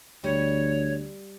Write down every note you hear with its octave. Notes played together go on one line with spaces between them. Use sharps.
D2 G3 C#5